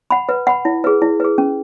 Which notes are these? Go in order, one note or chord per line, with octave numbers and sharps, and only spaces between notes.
F#5 B5
B4
F#5 B5
E4
G#4 B4
E4
G#4 B4
C#4